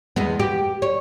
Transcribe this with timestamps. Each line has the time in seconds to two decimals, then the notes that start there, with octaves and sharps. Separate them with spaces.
0.16 E2 G#3 B3
0.40 G4
0.82 C#5